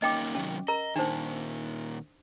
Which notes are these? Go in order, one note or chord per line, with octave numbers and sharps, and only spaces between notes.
A#3 C#4 D#4 D#5 G5 D6
C3 D#3 F#3 C#4
A#4 D#5 A#5
A#2 D#3 D4 D#4 C5